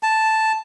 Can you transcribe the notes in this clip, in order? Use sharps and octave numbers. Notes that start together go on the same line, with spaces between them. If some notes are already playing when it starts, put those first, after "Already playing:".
A5